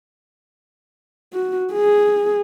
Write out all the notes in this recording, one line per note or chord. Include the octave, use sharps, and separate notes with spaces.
F#4
G#4